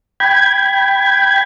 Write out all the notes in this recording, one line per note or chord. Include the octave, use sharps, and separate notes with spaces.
G5 B5 G#6